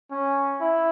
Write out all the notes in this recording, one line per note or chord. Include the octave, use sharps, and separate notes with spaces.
C#4
E4